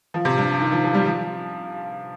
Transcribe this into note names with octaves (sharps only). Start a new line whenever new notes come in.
F3
C3
G2
D#3
F3
F3
G3
F3